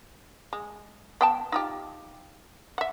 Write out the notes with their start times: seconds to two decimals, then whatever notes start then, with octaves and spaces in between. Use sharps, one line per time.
0.53 G#3
1.21 B3 G5 A5
1.52 D#4 F4 G4
2.78 E5 F#5